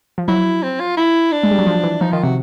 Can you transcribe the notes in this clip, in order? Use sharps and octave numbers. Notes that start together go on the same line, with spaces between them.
F3
F#3 E4
C4
F4
E4
D4
G#3
G3
F#3
F3
E3
F3 D#4
D#3 F4
C3 F#4